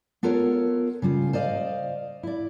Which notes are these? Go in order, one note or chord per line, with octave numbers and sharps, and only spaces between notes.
B3 F4 A4 A#4 C#5
C#3 G3 F4
C5 D5 D#5 F5
E4 D5